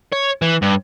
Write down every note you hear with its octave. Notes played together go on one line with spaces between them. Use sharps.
C#5
E3
G2